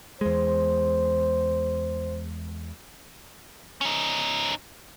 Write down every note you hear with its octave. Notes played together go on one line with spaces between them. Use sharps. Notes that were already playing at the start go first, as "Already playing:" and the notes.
E2 G#3 C5
C#4 D#4